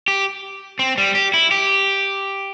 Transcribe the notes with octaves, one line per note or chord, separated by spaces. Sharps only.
G4
C4
G3
G4
E4
G4